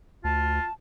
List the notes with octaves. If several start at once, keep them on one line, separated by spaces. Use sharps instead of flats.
D2 F4 A5